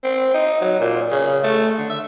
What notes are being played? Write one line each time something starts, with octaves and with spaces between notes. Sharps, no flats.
C4
D#4
F#3
A#2
C#3
A3
D3
E5